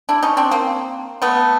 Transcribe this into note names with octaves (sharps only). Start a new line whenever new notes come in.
D4 E4
C#4 D#4
C4 D4
A#3 C4
A3 B3